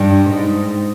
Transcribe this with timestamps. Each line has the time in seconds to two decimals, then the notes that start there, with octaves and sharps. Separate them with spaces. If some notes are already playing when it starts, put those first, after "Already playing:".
Already playing: G2
0.30 G#2